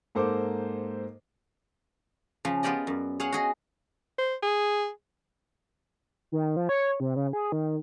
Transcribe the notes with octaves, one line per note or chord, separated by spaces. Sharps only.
G#2 A#3 A4 C5 D6
C#3 F3
B3 F4 G4 D5 D#5
F#2
G#4 C#5 F5 F#5
F#4 G#4 D#5
C5
G#4
D#3
F3
C#5
C3
C#3
G#4
D#3